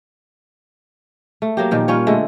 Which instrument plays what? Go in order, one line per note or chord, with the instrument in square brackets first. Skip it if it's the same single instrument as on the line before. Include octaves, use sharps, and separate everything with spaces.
[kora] A3
F#3 A#3 G4
A#2 D#3 F3
G3 C#4 F4 C#5
D3 G#3 A3